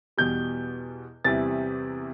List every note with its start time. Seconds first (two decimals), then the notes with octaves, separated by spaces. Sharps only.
0.17 E2 B2 G3 G6
1.24 E2 C3 E3 G3 A6